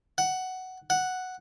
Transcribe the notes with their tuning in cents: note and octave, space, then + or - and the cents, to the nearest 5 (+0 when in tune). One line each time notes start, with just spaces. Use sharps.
F#5 +10
F#5 +0